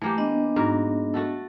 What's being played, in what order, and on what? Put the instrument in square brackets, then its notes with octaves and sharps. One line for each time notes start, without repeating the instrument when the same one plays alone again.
[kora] E3 A#3 G4 [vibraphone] A3
[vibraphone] B3 D4 D#5
[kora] G#2 F#4 A#4
A3 F#4 A4